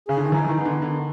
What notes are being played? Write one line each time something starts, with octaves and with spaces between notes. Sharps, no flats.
C#3 G#4
D3
D#3
E3 D#4
E3
D#3
B3
D3
D3 D#3